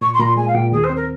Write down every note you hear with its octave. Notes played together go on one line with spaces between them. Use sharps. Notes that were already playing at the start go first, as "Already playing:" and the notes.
A#2 C#6
C6
A#2 A#5
C6
G#3 G#5
F5
A#2 G5
D#2 G#4
C5
C4
A#4